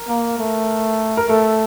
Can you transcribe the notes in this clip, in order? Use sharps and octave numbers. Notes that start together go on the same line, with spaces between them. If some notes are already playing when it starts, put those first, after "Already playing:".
Already playing: A#4
A#3
A3
A#4
A3 A4